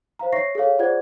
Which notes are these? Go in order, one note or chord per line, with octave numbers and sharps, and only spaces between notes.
C5 F5 A#5
C#5 E5 C#6 A#6 C7
G#4 A4 C#5 F5
F4 G#4 C5 D5 F#5 G#6